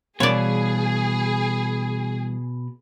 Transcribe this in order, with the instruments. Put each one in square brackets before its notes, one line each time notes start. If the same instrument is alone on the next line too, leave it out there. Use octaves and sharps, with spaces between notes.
[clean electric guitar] B2 [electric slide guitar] E3 G3 F5 [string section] G#4 [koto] C#5 D5